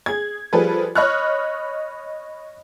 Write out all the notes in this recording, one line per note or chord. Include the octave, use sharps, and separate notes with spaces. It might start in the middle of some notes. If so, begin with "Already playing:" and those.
G#4 G#6
F3 G3 G#4 A4 B4
C#5 D#5 B5 C#6 F6 F#6